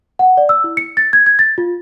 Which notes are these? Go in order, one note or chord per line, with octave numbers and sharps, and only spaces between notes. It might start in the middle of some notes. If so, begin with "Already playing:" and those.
F#5
D5
E6
E4
C#7
A6
G#6
G#6
A6
F4